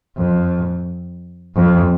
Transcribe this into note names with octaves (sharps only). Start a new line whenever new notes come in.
F2
F2